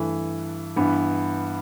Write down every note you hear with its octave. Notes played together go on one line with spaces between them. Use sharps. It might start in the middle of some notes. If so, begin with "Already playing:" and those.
Already playing: G2 E3 A3
G2 E3 B3